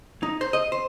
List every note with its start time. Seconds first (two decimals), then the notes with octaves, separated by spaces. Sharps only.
0.23 D#4
0.41 C5
0.53 D#5
0.72 C5